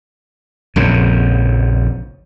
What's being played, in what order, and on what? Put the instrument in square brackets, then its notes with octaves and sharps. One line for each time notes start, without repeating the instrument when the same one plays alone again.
[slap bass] A#1 F2 C#3